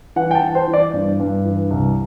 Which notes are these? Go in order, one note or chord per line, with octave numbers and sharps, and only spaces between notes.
E3 F#5
G5
A5
E3
C5
E3
D5
G2
G2
E3
C2